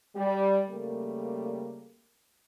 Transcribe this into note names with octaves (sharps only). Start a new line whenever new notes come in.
G3
C#3 G3 A3 A#3